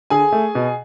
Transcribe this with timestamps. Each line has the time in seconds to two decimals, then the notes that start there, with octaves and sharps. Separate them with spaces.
0.10 D3 G#4 G#5
0.32 A3
0.55 B2